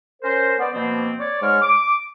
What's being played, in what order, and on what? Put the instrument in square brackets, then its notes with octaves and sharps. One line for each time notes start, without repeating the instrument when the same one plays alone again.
[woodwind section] C#4 A#4 C5
B3 D5
B2 F3 A#3 C4
C#5 D5
G#2 G#3 C#5 F6
D6